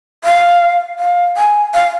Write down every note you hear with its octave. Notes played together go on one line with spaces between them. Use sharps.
F5
F5
G#5
F5